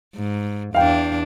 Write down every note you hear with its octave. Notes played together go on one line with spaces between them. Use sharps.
G#2
E2 D4 F5 G5